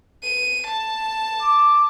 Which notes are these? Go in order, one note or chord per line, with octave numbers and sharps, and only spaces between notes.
D#7
A5
D6